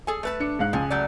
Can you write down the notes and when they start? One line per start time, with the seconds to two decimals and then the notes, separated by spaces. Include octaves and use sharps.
0.07 G#4 A4 G#5
0.23 A3 B4 A5
0.40 D4 C#7
0.59 G#2 F5 F#6
0.73 C#2 F3 G#5
0.90 F#3 A3 D5